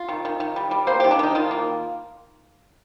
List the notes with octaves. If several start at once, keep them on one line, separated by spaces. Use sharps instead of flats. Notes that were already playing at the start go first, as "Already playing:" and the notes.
Already playing: F4
D#3
D#3
D#3
G3
G3
A#3 C5
D#3 G4
D4
D#3 D#4
D#3 F4
A#3